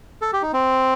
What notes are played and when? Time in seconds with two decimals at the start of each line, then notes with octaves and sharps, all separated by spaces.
0.22 A4
0.33 G4
0.42 D#4
0.53 C4